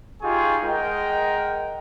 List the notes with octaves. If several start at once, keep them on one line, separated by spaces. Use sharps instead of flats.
D#4 F4 G4 G#4 G#5 C#6
G#3 A#4 D#5 F#5 G5